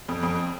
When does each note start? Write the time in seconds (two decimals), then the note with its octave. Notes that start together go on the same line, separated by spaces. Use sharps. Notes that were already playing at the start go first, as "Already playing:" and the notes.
0.08 F2
0.23 F2